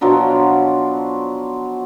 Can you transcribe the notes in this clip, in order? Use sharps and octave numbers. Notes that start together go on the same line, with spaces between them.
B2 F3 F#3 D4